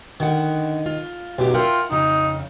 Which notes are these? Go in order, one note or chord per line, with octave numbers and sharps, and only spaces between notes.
D3 D#3 F#5
F4
B1 F#2 G4
F4 A#4 E5 F#5 G5
F2 C#3 D#4